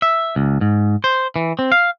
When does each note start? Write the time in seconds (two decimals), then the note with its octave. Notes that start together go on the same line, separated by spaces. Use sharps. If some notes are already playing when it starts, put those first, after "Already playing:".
0.02 E5
0.36 C#2
0.61 G#2
1.04 C5
1.36 E3
1.59 C4
1.72 F5